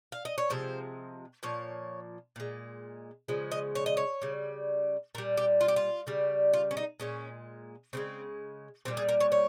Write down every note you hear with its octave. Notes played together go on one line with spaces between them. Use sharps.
F5
D#5
C#5
C3 F3 G#3 C5
A#2 F3 C#5
A#2 G#3
C#3 F3 G#3
D#5
C#5
D#5
C#5
C#3 G3
A#2 G3 A#4
G4
F4
G4
F4
C#3 G3
F4
C#4
D#4
A#2 G#3 C#4
C#3 F3 G#3 C4
A#2 G3 C4
G#4
A#4
C#5
C#5